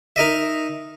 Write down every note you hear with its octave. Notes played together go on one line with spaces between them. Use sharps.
D#4 A#4 D#5 E5